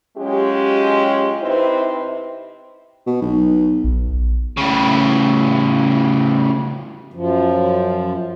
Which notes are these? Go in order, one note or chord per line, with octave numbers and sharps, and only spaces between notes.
F#3 G#3 C#4 F4 G4
C3 C4 D#4 E4 B4 C5
B2
B1
A#1
A2 C#3
F#2 F3